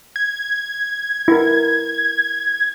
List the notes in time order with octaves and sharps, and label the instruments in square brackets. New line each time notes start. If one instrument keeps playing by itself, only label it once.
[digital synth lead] G#6
[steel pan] E4 A#4